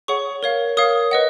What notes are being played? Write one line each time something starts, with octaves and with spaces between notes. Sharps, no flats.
G#4 C#5 F#5 C#6
A#4 C#5 F5
A#4 C#5 F5 D#6
B4 D#5 F#5